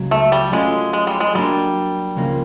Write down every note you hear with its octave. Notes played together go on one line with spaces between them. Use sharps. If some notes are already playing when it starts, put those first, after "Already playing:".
Already playing: C#2 C#3 F#3
A3
G3
F#3 G#3 A3 C#4 F4
G#3
G3
G#3
F#3 G3 A#3 D4
C#2 C#3 F3 A#3